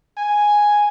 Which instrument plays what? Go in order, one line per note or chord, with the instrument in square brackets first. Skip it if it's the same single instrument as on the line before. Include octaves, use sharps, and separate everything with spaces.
[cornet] G#5